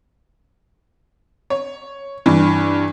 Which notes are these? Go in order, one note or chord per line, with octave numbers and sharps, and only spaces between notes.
C#5
G2 E3